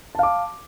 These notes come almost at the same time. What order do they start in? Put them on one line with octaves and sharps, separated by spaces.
A5 F5 D6